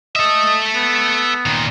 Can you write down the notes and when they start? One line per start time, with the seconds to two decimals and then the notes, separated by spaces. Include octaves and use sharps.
0.16 A4 D#5 E5
0.75 B3
1.46 A#2 D#3